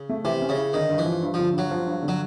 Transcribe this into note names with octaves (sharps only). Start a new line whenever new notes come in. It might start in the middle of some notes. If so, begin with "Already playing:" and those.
Already playing: C#3
A3
C3 E3
C#4
C#3
E4
D3 D#3
G2
E3
F3
G2
D3 F3
G2 F#3
F3
G2
D3
F#3